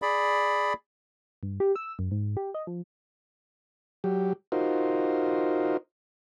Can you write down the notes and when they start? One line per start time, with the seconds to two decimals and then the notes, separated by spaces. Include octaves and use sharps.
0.02 G#4 D5 B5
1.43 G2
1.60 G4
1.76 E6
1.99 F#2
2.11 G#2
2.37 G4
2.54 D#5
2.67 F3
4.04 F#3 G4
4.52 D#4 F4 F#4 A#4 C5